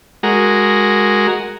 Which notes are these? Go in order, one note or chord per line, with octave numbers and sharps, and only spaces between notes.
G#3 F#4 A#4